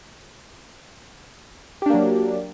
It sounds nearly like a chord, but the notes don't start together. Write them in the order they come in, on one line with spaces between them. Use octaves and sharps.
G4 D4 A#3 F#3